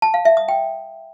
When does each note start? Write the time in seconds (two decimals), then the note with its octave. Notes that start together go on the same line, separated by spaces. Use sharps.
0.02 A5
0.14 F5
0.25 E5
0.37 D#6
0.48 G5